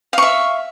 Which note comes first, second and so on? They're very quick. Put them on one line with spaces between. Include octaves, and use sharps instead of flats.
F5 C#6 E5